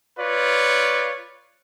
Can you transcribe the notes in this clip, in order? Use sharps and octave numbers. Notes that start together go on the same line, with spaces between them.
F4 B4 C#5 D5